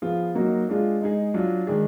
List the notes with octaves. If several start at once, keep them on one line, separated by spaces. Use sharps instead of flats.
F3 B3 F4 G#4
F#3 A#3 D#4 F#4
G#3 D4 F4 G#4
G#3 D#4 G#4
F#3 D4 F4
D#3 G#3 D4 G#4